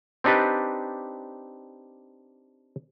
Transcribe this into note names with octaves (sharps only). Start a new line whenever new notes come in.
C4 D4 D#4 G4 B4 D5